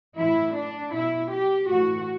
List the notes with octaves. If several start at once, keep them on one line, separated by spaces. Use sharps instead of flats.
A2 E3 E4
D4
B2 E4
G4
A2 E3 F#4